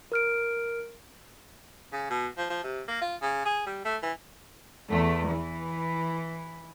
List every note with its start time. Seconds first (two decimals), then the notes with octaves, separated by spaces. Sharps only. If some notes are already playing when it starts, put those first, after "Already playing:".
0.12 A#4 F6 D7
1.93 C#3
2.11 B2
2.38 F3
2.50 F3
2.64 C3
2.88 A#3
3.02 F4
3.22 C#3
3.46 G#4
3.67 G3
3.85 A3
4.03 E3
4.89 E2 A3
5.28 E3